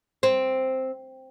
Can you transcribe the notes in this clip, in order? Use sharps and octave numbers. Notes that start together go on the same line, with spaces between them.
C4